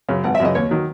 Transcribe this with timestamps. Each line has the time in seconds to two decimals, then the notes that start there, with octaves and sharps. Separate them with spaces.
0.08 F#2 C#3
0.24 G#1 F#5
0.35 E5
0.40 F#2 C#3 D#5
0.55 D#2 C#5
0.71 D#3 F#3